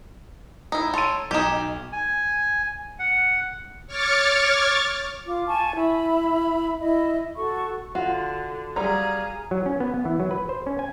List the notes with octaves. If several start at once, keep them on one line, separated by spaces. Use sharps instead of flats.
D#4 E4
A4 C#5 C6 D#7
B1 D#4 G4 E7
G#5
F#5
C#5 C#6 D6 F6 A6
F4 D6
G#5 A5 C#6
E4 B5
E4 D#5
F#4 A4 C#6
D3 F4 F#4
F#3 G3 G#4 F5 A#5
F#3
C#4
B3
B3
E3
F#3
B4
C5
C#4
G#5